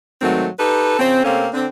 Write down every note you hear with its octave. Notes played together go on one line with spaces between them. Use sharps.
G#2 D#3 F#3 A3 C4
D#4 G4 A4 B4
C#3 F3 C4
C3 A3 A#3 C4 C#4
D3 C4